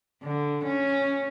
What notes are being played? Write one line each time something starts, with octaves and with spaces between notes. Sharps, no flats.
D3
C#4